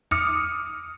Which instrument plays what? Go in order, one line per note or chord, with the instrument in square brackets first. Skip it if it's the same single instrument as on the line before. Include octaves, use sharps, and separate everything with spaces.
[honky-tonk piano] D6 D#6 F6 C#7